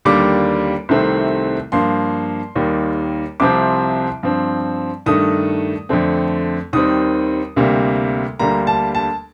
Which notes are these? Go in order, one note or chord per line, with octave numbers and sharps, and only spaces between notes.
D#2 D3 G3 A#3 D6
C2 C3 D#3 A3 C4
G2 F3 A#3 C6
D#2 D#3 G3 A#3
C2 C3 F3 C4 D6
G2 F3 C4
G2 D#3 A3 D#6
F2 D3 A3 C4
D#2 D#3 G3 C4 D#6
D2 C3 G3 A#3
D2 D3 G3 A#3 A#5
A5
A5